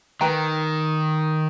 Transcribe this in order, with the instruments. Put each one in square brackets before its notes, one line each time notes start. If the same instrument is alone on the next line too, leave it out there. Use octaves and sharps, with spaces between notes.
[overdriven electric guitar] D#3 [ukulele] B4 G5 A#5